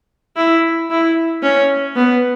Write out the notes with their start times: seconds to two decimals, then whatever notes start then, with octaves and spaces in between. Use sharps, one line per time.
0.37 E4
0.90 E4
1.43 C#4
1.96 B3